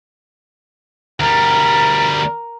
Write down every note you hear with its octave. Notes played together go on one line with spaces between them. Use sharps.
D2 G3 A#4